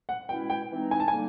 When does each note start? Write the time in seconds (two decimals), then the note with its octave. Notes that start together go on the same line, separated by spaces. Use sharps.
0.09 F#5
0.29 B2 G#3 C#4 E4 G5
0.50 G5
0.71 E3 G#3 C4 D#4
0.91 G#5
1.00 A5
1.08 D3 G3 A#3 D#4 G#5